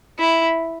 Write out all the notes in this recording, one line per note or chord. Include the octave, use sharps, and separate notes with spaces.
E4